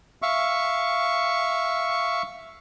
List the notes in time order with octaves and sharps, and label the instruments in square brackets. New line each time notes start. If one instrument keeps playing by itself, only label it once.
[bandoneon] E5 F5 C#6